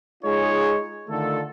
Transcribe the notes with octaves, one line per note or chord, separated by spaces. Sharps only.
G#3 D#4 F4 G#4 C#5
D3 D#3 A3 F4 A4